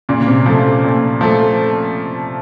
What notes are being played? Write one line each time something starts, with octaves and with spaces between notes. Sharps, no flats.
A#2 C#3
C#3
C3
F3 A3
A#2
F3 A3